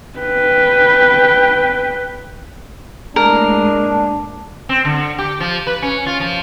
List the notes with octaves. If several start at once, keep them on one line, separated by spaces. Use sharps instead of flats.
B4 G5
A2 G#3 A#3 D4 A#4
C4
D3
G4
F3
B4
C#4
F4
F3